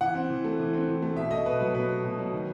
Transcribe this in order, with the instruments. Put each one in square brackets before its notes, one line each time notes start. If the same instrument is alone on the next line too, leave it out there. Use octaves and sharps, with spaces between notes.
[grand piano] E3 F#5
C4
E3
A3
E3
C4
E3
A3
B2 E5
A3 D#5
B2 B4
F#3 B4
B2 B4
A3
B2
F#3
D#3